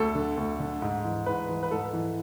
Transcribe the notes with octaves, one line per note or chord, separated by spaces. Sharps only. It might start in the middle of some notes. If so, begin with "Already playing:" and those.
Already playing: D2 A4
D3
D2
D3
G#2
E3
G#2 B4
E3
B4
G#2 A4
E3